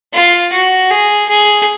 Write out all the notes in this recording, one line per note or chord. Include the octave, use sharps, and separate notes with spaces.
F4
F#4
G#4
G#4